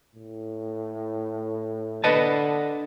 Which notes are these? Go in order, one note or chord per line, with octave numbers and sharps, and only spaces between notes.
A2
D3 B4 D#5 A5